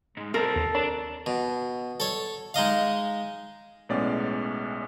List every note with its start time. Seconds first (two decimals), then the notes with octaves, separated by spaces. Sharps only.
0.17 G#2 G#3
0.34 C2 C4 A4 A#4
0.56 D#2
0.75 D4 C#5 A#5
1.26 B2
2.00 A4 C#5
2.54 G#3 D#4 D#5 F5
3.89 B1 A2 G#3 B3 C#4 D5